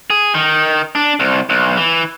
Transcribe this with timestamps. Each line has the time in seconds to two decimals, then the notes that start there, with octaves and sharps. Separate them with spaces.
0.10 G#4
0.35 D#3
0.95 D4
1.20 C2
1.50 B1
1.77 E3